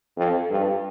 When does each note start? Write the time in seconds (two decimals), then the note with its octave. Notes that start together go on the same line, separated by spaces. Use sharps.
0.17 F2
0.50 G2